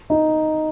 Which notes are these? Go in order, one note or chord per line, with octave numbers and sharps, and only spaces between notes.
D#4